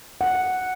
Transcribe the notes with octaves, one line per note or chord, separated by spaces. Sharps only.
F#5